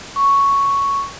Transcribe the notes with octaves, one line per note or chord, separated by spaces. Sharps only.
C#6